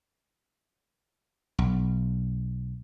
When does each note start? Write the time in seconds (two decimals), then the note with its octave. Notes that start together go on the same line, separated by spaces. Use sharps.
1.59 B1